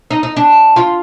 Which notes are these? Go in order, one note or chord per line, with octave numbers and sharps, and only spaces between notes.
D#4
D#4
D4
F4